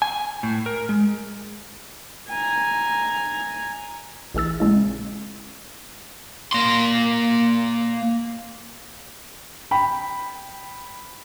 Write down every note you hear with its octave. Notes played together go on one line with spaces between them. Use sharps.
G#5
A2
A#4
G#3
G#5 A#5
A#1 E3 G#4 E6 A6
A#2 C#3 G#3 E4
A#3 C6
G5 B5